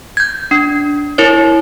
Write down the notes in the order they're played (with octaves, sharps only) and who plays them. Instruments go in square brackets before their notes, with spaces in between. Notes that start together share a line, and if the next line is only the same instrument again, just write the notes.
[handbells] G6 G#6
D4
E4 A#4 C#5